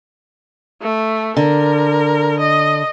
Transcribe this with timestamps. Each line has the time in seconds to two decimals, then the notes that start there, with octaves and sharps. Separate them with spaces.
0.81 A3
1.37 D3 A#4
2.39 D#5